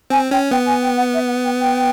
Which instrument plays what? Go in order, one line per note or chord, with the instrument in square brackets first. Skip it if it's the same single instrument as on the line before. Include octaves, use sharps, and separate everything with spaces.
[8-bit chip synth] C4 [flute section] G#5
[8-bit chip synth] C#4 [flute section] G5
[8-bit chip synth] B3 [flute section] G5
[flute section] G#5
G5
F#5
E5
F#5
G5
G5